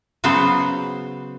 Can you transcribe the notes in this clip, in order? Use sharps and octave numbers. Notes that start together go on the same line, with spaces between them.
C#3 F#3 B3 F#4 C5